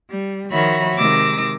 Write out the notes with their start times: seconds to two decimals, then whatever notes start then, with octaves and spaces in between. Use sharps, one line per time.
0.10 G3
0.50 D#3 F3 F#4 C#5 E5 B5
0.97 C3 D#3 G#3 D6 E6 A#6